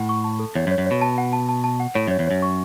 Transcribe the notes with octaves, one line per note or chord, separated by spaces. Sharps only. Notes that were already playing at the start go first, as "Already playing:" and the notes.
Already playing: A2 F#5
C#6
A5
A4
E2 C#5
F#2
C#5
F#2
B2 C#5
A5
F#5
A5
A5
A5
F#5
A2 C#5
F#2 C#5
E2
F#2 C#5
C#6